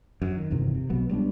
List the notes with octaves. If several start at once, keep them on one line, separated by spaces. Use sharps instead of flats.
F#2
D#3
G1 E2 C3 D#3
C3
B1 B2 F#3 B3
C#2 G3 B3 D4